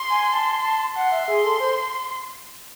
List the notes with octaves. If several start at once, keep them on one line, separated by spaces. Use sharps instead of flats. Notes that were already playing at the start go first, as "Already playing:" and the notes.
Already playing: C6
G#5
A5
A5
F#5 C6
E5
G#4
A4
C5